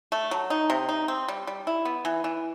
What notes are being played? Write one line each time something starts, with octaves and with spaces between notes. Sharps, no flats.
A3
F#3
D#4
C3
D#4
C4
G3
G3
E4
B3
E3
E3